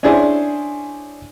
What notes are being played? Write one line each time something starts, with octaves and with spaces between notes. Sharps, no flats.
C#4 D4 E4 G#4 C5 D5